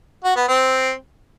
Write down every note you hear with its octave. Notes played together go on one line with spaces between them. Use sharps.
F#4
B3
C4